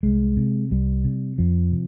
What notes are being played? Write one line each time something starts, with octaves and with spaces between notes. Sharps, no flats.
C2 G#3
C3
C2 G3
C3
F2 F3
C3